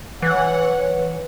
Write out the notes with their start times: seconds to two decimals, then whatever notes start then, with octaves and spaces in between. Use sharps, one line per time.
0.22 E3 C#5 F#5